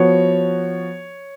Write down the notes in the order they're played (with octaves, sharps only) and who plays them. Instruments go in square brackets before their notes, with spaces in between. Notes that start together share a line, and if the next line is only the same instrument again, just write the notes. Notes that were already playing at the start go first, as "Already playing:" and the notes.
Already playing: [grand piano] F3 B3 F#4 [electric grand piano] C#5